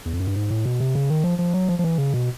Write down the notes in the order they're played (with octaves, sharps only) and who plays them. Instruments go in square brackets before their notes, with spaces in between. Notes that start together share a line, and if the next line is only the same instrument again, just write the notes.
[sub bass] E2
F2
F#2
G2
G#2
A2
B2
C3
C#3
D#3
F3
F3
F#3
F3
F3
E3
C#3
B2